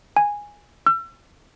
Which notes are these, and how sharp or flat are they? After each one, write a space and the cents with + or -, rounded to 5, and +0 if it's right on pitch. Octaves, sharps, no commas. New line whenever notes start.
G#5 -10
E6 +35